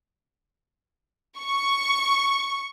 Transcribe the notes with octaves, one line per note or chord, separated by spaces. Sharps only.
C#6